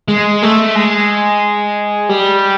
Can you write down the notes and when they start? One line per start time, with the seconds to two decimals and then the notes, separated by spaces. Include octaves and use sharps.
0.08 G#3
0.42 A3
0.75 G#3
2.09 G3